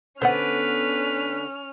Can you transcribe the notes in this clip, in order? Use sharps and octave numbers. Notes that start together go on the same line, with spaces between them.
D3 B3 C#4 B4 C5 F#5 F6